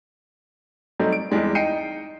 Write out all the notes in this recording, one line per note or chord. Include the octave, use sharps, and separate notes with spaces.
F#3 G3 A3 C4 D#4
D7
E2 E3 G3 G#3 C4
D#4 G5 C7 C#7 D#7